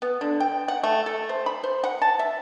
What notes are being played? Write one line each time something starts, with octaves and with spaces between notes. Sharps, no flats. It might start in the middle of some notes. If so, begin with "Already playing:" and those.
B3
D3
G5
F#5
A3
A4
C5
B5
C5
F#5
A5
E5